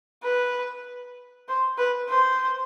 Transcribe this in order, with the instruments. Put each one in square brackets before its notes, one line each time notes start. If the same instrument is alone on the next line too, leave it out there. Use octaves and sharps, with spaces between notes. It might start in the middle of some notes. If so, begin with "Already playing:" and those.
[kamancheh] B4
C5
B4
C5